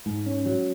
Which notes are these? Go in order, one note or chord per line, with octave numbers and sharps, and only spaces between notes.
G#2
C#4
F#3